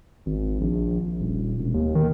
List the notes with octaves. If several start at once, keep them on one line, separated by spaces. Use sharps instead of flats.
G#1
A#1
D#1
E1
D#2
D#3